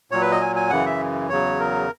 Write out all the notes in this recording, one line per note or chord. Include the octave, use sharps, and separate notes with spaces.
A#2 F#3 C#5
B4
D#5
G#5
G#5
F#2 C#3 E3 F#5
E5
E2 C#3 F#3 C#5
A#4